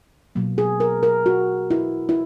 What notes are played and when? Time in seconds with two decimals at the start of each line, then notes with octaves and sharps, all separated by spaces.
0.35 B2 F#3 A#3
0.58 G#4
0.80 A#4
1.03 A#4
1.26 F#4
1.71 E4
2.09 E4